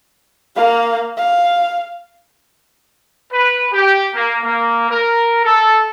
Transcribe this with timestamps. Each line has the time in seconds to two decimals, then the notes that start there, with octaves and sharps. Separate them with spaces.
0.55 A#3 F5
1.17 F5
3.32 B4
3.72 G4
4.15 A#3
4.44 A#3
4.89 A#4
5.44 A4